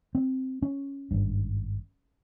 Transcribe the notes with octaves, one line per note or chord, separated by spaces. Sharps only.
C4
C#4
G#1 G2